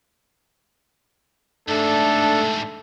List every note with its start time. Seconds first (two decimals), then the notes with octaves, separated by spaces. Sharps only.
1.69 G#2 G3 A3 D4 A4